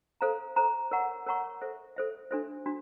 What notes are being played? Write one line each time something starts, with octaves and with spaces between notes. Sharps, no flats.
A4 C5 F5 A#5
A4 C5 F5 A#5
A#4 C#5 F#5 A#5 C#6
A#4 C#5 F#5 A#5 C#6
A4 C5 E5
A4 C5 E5
D4 F#4 A4 C5 E5
D4 F#4